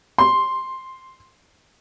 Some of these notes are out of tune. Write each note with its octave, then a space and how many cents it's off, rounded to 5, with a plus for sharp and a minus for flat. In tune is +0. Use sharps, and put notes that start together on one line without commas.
C6 +5